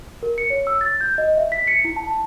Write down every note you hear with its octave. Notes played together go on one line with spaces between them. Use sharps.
A#4
C#7
C#5
E6
A6
G6
D#5
E5
B6
C#7
E4
A5